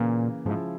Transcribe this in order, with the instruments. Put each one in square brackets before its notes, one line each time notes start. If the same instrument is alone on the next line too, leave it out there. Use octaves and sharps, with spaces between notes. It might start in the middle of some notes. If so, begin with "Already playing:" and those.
Already playing: [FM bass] A#2 [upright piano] C#3 E3 A#3
[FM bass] G#2 [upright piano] C#3 F3 G#3 E4